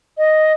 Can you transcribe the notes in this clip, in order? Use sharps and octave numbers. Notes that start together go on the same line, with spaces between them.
D#5